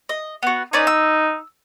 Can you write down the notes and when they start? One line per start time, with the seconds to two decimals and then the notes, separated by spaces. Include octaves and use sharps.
0.09 D#5
0.43 B3 F#4
0.73 C#4 D#4 B4 D5
0.87 E6